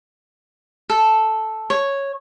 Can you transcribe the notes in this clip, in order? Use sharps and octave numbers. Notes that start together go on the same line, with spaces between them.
A4
C#5